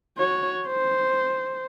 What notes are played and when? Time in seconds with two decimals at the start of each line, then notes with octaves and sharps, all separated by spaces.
0.18 F#4 C#5
0.67 C5